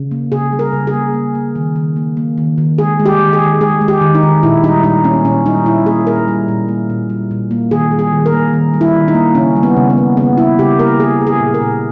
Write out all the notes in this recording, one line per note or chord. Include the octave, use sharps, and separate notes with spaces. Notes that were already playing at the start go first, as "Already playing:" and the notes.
Already playing: C#3
A#3
C#3 G#4
G3
A#4
C#3
G#4
A#3
A#3
A#3
D#3
D#3
A#3
A#3
D#3
D#3
G#3 G#4
G#3
G4
D#3
G#4
D#3
G#3 G#4
G#3
G4
D#3
D#4
D#3
A#2 E4
G3 D#4
A#2 D#4
A#3 C#4
A#2 C#4
G3 D#4
A#2 E4
A#3 G#4
A#2 A#4
G3
A#2
A#3
A#2
G3
A#2
A#3
D#3 G#4
G3
G#4
D#3
A#4
A#3
D#3
G3
E4
D#3
D#4
A#3
C#3 C#4
G3
B3
C#3
B3
A#3
C#3 B3
G3 E4
C#3 G4
A#3 A#4
A#3 G#4
A#3
G#4
A#2
A#4
A#2